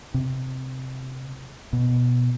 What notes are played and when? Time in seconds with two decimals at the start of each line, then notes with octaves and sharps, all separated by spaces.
0.14 C3
1.73 B2